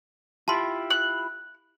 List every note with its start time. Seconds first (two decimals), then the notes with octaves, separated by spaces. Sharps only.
0.48 E4 F4 G4 A5 C6
0.90 F#6